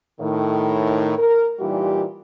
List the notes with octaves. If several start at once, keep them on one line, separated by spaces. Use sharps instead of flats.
A2 D#3
A#4
A#2 E3 G3 D#4 F4 G4